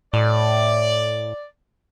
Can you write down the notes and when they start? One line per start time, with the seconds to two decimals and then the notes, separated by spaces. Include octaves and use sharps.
0.14 A2 D5